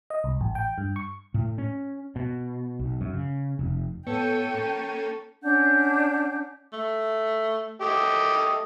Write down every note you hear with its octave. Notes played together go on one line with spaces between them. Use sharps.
D#5
C2
A1
G5
G2
C#6
A2
C#4
B2
B1
F#2
C#3
F1
A2 B3 A4 C#5 G5 D#7
A#3 C#4 C#6 C#7
C#4 D4 F#5 G6
A3
A3 G4 D#5